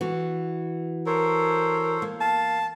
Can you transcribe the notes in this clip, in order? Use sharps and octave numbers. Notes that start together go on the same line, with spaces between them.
E3 F#4
A4 A#4 C5 C#5
A#3
F5 A5